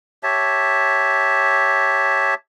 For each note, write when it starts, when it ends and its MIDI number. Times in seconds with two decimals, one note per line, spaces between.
0.23 2.34 67
0.23 2.34 73
0.23 2.34 76
0.23 2.34 81